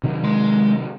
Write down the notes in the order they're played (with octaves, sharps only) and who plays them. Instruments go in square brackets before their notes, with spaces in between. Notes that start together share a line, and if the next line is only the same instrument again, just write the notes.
[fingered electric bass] C3 D#3 F#3
[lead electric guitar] G#3 C6